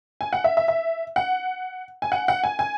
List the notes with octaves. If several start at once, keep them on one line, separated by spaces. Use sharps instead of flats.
G#5
F#5
E5
E5
E5
F#5
G#5
F#5
F#5
G#5
G#5